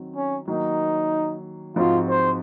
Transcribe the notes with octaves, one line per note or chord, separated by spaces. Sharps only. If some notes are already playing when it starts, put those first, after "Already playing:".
Already playing: D#3 F#3 C4
C#4
D#3 F#3 A#3 D#4
G#2 F3 C4 D#4 F4 F#4
C5